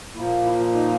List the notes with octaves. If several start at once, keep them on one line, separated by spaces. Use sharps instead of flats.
A#2 F3 A#3 E4
E4
F4
D#4